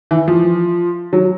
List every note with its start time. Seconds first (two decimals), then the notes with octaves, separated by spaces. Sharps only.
0.11 E3
0.28 F3
1.13 F#3